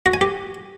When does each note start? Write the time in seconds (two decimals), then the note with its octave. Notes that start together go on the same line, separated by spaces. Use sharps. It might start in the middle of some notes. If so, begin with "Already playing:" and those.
0.06 F#4
0.14 G#5
0.21 G4